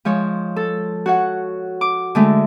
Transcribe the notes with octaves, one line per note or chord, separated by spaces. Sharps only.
F3 G#3 C#5
A4
F#4 C#5 F#5
D6
D3 G#3 A3